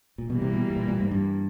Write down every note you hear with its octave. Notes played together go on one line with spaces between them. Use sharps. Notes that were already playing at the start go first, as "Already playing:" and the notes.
A#2
B2 E3 G3 A#3
C3
B2
A2
A#2
A#2
G#2
G2